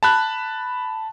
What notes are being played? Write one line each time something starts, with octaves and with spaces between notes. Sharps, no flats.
A5 B5 F#6